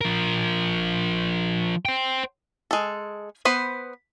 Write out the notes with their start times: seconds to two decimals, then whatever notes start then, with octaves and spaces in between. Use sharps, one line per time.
0.01 F3 A#4
1.85 C5 G5
2.71 G#3 A4
3.45 B3 B4 C5